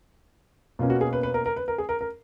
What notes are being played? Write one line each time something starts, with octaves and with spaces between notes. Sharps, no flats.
B2 A#3 C#4 F4
F#4
G#4
B4
B4
A#4
A#4
B4
A#4
G#4
A#4
A#4